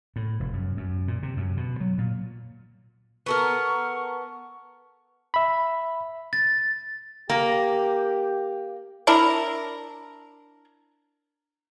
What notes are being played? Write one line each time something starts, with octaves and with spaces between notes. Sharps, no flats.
A2
F1
F#2
F#2
A#2
C3
F#2
B2
F#3
A#2
B3 A4 A#4 C#6
E5 B5
A6
A#3 G4
D4 E4 A#4